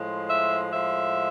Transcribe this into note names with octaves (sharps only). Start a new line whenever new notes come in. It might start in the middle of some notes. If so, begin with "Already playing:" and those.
Already playing: A2 F3 G#3
E5
A2 F3 G#3 E5